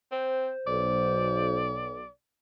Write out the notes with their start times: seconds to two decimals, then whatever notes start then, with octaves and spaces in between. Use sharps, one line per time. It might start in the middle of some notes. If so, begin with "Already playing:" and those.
0.12 C4 C5
0.67 B1 D5